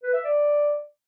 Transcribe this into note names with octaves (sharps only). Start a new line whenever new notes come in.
B4
E5
D5